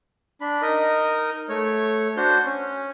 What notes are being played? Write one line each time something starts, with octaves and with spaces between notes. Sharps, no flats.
D4 B5
D#4 A#4 D#5
A3 C#5
D4 F#4 C5 G6
C#4